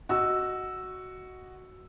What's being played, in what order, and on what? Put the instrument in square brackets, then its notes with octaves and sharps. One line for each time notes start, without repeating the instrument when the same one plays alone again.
[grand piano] F#4 D#5 E6